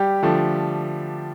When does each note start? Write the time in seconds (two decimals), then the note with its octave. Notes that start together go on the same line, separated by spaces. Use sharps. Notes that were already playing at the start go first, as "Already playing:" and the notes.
Already playing: G3 G4
0.23 D3 F3 A3